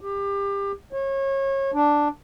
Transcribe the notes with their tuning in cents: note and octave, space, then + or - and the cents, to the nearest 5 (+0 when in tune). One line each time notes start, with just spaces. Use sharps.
G4 +25
C#5 -30
D4 +0